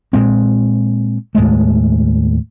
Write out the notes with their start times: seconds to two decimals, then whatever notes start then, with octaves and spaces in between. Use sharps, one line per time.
0.13 A#2 G#3 C4
1.35 D#2 A2 G#3 A3